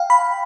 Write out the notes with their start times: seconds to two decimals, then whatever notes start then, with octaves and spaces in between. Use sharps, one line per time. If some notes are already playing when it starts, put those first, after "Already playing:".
Already playing: F5 G5
0.10 B5